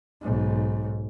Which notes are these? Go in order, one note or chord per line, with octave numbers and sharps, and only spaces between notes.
B1 G#2